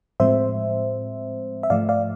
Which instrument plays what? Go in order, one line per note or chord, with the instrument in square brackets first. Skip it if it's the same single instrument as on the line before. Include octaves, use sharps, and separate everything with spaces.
[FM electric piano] A2 F3 G#3 C4 C5 E5
E5
G#2 F3 A3 D5 F5
D5 F5